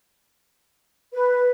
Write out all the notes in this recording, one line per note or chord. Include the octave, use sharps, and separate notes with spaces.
B4